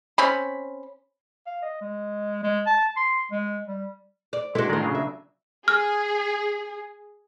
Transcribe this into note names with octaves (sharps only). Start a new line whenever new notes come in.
C4 C#4 B5
F5
D#5
G#3
G#3
A5
C6
G#3
G3
D5
G#3 D4 E4 F#4 A4 C5
A2 D#3 G#3 F4 D5
C#3 F#3 G#4
E5
G#4 F6